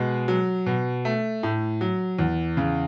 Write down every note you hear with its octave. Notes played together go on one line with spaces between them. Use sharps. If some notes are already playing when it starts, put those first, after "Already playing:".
Already playing: B2 G#3
F#3
B2
A3
A2
F#3
E2
C#3